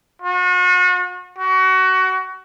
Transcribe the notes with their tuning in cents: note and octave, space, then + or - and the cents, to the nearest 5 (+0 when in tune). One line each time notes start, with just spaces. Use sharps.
F#4 -40
F#4 +25